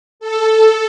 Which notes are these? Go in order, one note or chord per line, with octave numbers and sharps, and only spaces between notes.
A4